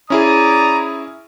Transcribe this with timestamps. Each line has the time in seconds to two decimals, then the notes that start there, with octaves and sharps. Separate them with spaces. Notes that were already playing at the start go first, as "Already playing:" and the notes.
0.10 C#4 E4 G#4 D5 A#5 D#6